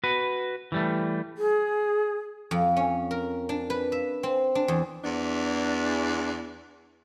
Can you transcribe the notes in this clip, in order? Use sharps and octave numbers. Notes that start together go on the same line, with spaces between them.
F#4 B4
E3 G3 A3
G#4
F2
C#4
A#4
D4
B4
E5
C4
D4
E2
E2 D4